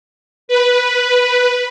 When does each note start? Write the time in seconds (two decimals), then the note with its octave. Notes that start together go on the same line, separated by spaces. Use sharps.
0.48 B4